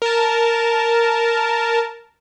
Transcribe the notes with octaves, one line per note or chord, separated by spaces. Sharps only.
A#4 A5